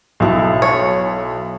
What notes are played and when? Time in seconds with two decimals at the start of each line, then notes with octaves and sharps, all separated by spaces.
0.20 B1 E4
0.62 C#5